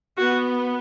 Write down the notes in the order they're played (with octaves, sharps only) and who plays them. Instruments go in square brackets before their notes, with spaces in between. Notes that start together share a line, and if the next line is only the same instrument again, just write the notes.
[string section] B3 [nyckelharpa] F#4